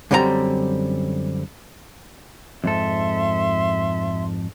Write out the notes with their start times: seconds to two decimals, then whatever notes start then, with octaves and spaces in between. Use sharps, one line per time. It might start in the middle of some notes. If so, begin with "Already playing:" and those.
0.11 F#2 D3 G3 C4 G#4 A#5
2.64 F2 G#2 A4 E5 C6